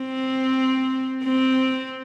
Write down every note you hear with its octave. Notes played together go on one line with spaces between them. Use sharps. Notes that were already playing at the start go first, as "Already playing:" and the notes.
Already playing: C4
C4